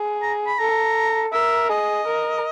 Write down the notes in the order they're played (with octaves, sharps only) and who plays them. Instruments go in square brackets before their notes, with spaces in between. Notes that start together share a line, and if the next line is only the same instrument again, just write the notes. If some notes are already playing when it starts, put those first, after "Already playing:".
Already playing: [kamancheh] G#4
[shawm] A#5
B5
[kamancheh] A4 [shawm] A#5
[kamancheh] A#4 [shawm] E5
[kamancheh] G#4 [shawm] D#5
[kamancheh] A#4